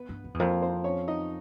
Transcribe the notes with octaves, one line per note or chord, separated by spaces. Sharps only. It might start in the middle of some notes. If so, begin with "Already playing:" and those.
Already playing: B3 B4
G2
F2
E2
F2 A#3 A#4
C4 C5
C#4 C#5
D#4 D#5